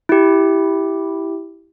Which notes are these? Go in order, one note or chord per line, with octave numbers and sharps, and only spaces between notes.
E4 G4